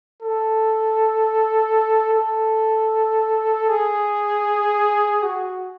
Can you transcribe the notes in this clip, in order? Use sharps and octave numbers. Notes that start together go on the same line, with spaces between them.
A4
A4
G#4
F#4